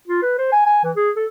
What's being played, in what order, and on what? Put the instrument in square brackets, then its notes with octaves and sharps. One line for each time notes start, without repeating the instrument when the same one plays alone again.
[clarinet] F4
B4
C5
G#5
G#5
E3
G#4
A4